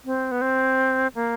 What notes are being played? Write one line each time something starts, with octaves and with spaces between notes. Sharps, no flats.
C4
B3
C4
A#3